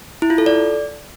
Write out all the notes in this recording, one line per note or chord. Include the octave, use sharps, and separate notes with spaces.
E4
F4
A4
D5